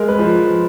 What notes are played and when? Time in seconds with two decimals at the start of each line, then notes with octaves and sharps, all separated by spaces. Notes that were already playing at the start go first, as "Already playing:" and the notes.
Already playing: G#3 A#4
0.08 B4
0.19 F3